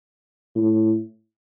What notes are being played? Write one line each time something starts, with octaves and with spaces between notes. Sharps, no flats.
A2